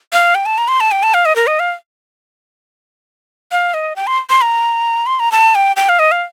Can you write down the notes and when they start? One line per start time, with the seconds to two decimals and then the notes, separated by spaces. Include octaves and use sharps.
0.13 F5
0.35 G5
0.46 A5
0.58 A#5
0.68 C6
0.80 A5
0.91 G5
1.03 A5
1.14 F5
1.25 D#5
1.36 A#4
1.47 D#5
1.60 F5
3.52 F5
3.74 D#5
3.96 G5
4.07 C6
4.30 C6
4.42 A#5
5.06 C6
5.20 A#5
5.32 A5
5.55 G5
5.76 G5
5.89 F5
5.99 D#5
6.12 F5